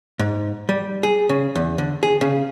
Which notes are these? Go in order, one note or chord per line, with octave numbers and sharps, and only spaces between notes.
G#2
G3
G#4
C#3
E2
D3
G#4
C#3